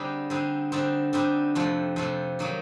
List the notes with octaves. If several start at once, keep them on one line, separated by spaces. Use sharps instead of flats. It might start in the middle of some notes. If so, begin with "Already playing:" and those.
Already playing: D3 G3 C4 D#4 G#4
D3 G3 C4 D#4 G#4
D3 G3 C4 D#4
D3 G3 C4 D#4
F2 C3 F3 A3
F2 C3 F3 A3
D#3 F#3 A#3 D#4